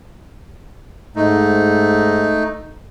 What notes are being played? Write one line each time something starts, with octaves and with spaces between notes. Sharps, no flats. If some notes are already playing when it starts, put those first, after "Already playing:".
G#2 A3 D#4